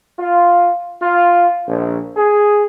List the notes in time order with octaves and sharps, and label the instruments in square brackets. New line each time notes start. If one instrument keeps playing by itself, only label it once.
[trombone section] F4
F4
A#1
G#4